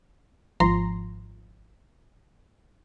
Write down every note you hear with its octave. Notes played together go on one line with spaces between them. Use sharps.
G#1 F3 A#5 C6